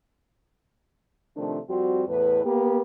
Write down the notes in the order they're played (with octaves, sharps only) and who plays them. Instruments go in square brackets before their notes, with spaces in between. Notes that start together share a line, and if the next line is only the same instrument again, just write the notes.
[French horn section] C3 D#3 F3 A3 C4 D4
F2 G3 C4 F#4
E2 A2 B4
A#3 B3 G4